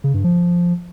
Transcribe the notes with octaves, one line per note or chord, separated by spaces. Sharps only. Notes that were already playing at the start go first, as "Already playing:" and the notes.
C#3
G2
F3